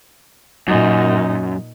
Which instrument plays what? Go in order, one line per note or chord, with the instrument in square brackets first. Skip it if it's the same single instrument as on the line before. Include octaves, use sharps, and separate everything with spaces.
[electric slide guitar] F#2 [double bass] A#2 D#4